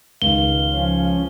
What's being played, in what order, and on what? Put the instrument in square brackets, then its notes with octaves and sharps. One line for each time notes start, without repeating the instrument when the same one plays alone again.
[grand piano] C#2 D#3 [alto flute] F5 [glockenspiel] G7
[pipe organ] F3 C#4